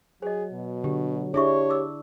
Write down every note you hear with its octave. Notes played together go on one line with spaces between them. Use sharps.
F#3 G#4 C5 D#5
B2
D3 G4
D4 E4 G4 G#4 C#5 E5 C#6
D6 E6